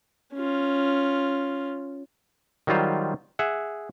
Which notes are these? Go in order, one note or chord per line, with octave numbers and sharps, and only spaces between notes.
C#4 F4
D#3 F#3 G3 F4 C5
G#4 E5 F#5